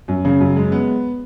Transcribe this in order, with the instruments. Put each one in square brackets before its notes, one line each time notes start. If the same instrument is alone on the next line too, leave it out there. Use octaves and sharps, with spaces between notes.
[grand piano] F#2
C#3
F#2
G#3
B3